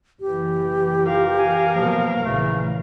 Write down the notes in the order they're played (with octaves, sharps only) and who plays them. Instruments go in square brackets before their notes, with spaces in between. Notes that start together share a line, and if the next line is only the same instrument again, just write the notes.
[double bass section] F#1 E3 [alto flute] G4
[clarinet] F4 [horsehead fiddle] A#4 F5
[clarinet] G#5
[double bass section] B2 F#3 A#3 [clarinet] F3
[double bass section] A#1 C#3 E3 [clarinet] A3